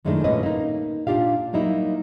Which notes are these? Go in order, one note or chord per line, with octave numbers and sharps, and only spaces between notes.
F#2 A2 D#3 G#3 A3 D4
A#2 A3 C#4 B4 D#5
A#3 D#4
A#2 D4 F4 G4 F5
F#3 G3 A#3 D#4 E4